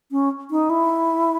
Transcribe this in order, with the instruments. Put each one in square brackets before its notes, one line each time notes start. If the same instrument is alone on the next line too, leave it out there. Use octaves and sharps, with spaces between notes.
[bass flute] C#4
D#4
E4